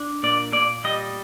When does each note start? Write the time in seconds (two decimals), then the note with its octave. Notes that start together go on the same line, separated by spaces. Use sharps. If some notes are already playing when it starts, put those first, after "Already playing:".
Already playing: D4
0.23 A#2 D5
0.53 A#2 D5
0.84 G3 D#5